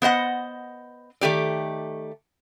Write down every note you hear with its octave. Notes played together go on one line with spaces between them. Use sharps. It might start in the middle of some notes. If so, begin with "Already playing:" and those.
B3 C5 D#5 F#5
D#3 A3 G4 D5